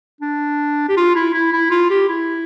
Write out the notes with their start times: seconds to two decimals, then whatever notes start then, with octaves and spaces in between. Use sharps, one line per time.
0.21 D4
0.89 G4
0.97 F4
1.15 E4
1.34 E4
1.53 E4
1.71 F4
1.90 G4
2.09 E4